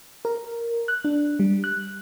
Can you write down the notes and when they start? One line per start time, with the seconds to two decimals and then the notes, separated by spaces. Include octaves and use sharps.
0.25 A#4
0.88 F#6
1.05 D4
1.39 G3
1.64 F#6